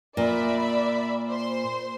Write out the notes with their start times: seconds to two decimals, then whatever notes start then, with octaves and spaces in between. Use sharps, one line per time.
0.17 A#2 D5 E5 B5
1.29 C5 C6